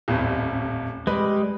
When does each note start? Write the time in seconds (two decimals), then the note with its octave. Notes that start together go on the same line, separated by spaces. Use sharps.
0.08 D#1 A1 F2
1.07 G3 G#3 B4